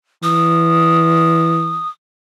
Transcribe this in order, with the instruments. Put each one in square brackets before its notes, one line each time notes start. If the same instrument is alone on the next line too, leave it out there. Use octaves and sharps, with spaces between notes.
[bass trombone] E3 [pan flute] D#6